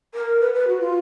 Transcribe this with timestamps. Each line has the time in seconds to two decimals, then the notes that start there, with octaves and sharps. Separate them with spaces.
0.14 A#4
0.40 B4
0.54 B4
0.68 F#4
0.80 F4